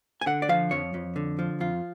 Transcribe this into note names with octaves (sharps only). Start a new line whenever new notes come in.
G#5
D3 F#5
D5
F3 F5
F2 C#5
F2
D3
F3
F2 F4